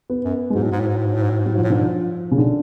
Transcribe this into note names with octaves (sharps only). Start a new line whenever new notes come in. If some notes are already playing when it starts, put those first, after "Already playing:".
B3
F#2
G#3
G#2 F#3
A2
G#2
A2
G#2
A2
G#2
A2
G#2
A2
G#2
A2 F#3
G#2 F3
A2
G#2 D3
F3
C#3
D3